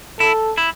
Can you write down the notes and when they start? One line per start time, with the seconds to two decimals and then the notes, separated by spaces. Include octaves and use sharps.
0.20 E4 A4
0.58 E4